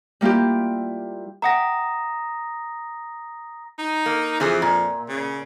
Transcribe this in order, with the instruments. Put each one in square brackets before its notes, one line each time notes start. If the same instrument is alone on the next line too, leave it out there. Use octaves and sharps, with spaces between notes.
[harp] G3 A#3 E4 F4 G4
[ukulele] E5 F#5 G5 [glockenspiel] A#5 D#6 A#6
[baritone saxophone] D#4
[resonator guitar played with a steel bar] A#3
[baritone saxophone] F2 [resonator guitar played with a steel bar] E3 C4 G#4
[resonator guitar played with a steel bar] A#2
[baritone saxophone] C#3